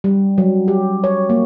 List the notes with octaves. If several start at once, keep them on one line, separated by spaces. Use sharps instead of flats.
G3
F#3
G4
C#5
A#3